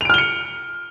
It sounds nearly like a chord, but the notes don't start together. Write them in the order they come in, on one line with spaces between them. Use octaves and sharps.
F7 D7 F6 G7 C#7